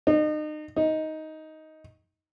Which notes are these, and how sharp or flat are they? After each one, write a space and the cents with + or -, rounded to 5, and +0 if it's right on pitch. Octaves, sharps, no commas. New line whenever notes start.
D#4 -35
D#4 +10